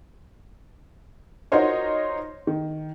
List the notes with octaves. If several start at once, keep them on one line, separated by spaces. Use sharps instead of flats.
D#4 F4 F#4 A#4 C5 C#5
D#3